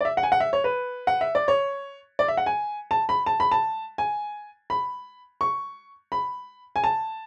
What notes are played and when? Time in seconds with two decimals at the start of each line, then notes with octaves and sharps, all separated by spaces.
0.01 D5
0.05 E5
0.17 F#5
0.23 G#5
0.32 F#5
0.40 E5
0.53 C#5
0.64 B4
1.07 F#5
1.21 E5
1.35 D5
1.48 C#5
2.19 D5
2.28 E5
2.37 F#5
2.46 G#5
2.91 A5
3.09 B5
3.26 A5
3.40 B5
3.52 A5
3.98 G#5
4.70 B5
5.41 C#6
6.12 B5
6.76 G#5
6.84 A5